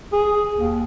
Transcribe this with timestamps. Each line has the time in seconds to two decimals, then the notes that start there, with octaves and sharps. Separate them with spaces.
0.13 G#4
0.57 D#2